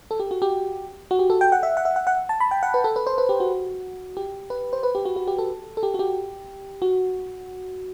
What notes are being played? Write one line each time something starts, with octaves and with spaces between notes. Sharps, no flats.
A4
G4
F#4
G4
F#4
G4
A4
G5
F#5
E5
F#5
E5
F#5
F#5
A5
B5
G5
F#5
B4
A4
B4
C5
B4
G4
F#4
G4
B4
C5
B4
G4
F#4
F#4
G4
A4
A4
G4
F#4
G4
F#4